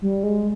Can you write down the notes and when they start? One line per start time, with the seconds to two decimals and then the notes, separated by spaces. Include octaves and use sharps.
0.02 G3
0.23 G#3